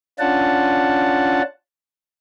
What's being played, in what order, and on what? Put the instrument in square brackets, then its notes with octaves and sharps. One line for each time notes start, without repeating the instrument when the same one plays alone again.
[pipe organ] C#4 D4 F4 F#5 A5